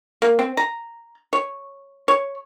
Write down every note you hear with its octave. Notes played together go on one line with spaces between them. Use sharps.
A#3
C4
A#5
C#5
C#5